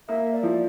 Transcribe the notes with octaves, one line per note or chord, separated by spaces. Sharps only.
A#3 E5
D5
F3